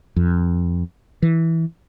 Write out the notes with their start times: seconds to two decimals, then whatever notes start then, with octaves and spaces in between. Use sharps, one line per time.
0.16 F2
1.22 E3